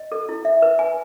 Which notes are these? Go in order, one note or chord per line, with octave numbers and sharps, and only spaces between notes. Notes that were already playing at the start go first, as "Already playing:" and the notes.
Already playing: D#5
A4
E4
E5
B4
G#5